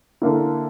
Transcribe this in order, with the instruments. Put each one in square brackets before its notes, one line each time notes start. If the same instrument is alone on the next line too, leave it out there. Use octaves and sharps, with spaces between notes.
[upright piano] D3 A#3 E4